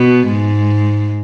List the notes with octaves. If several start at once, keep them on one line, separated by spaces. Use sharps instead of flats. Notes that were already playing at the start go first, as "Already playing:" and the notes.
Already playing: B2 B3
G#2 G#3